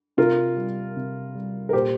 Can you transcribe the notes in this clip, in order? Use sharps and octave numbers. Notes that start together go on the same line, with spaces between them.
C3 F4 A#4
G3
C3
G3
A#4
A#2 G4 C5